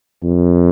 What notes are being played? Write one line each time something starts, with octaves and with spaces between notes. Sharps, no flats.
F2